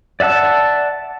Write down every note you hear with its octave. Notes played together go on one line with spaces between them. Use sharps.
D5 E5 F#5 A5 E6